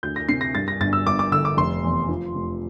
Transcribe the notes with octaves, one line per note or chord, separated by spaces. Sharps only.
D2 G6
A#6
C3 C7
A#6
G2 A6
A#6
G1 A6
E6
G1 D6
D6
D3 E6
D6
F1 C6
E2
F3
F1